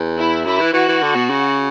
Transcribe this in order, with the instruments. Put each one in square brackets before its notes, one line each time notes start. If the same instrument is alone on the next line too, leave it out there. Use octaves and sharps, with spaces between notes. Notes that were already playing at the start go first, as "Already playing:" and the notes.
Already playing: [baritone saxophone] E2
[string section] E4
[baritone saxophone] F#2 [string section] E4
[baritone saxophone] E3
[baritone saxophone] E3 [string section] F#4
[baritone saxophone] E3
D3
B2
C#3